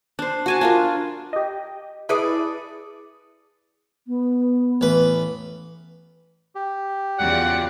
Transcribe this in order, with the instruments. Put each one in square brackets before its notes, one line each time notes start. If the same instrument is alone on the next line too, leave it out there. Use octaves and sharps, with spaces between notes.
[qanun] D4 C5
F#4 G#5 A5
D4 F4 A#4
[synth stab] G4 D#5
[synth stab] E4 B4 D#6 [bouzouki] G#4 A4 D5
[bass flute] B3
[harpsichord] A1 B4
[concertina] G4
[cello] E2 C#3 [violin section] F4 F#4 D5 [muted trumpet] F#5